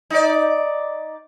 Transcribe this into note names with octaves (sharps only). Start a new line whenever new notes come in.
D#4 D5